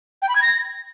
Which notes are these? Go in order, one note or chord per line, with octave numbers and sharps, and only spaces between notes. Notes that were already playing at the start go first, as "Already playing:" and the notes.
G5
B5
G#6
A#6